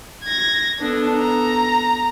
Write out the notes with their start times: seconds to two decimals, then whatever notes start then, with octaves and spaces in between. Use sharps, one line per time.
0.24 G#6 A#6
0.80 B3 D4 A4
1.17 A#5